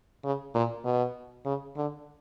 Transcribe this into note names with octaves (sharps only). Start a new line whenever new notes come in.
C#3
A#2
B2
C#3
D3